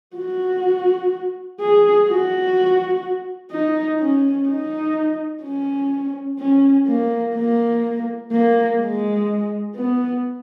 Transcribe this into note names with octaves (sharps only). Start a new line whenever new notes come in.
F#4
G#4
F#4
D#4
C#4
D#4
C#4
C#4
A#3
A#3
A#3
G#3
B3